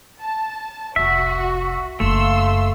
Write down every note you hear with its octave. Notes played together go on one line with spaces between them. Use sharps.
A5
F1 C2 F#4 E5
F#1 F#2 A3 F5 C6 E6